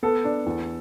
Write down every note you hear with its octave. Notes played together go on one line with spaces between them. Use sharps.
B3 A4
D4
E2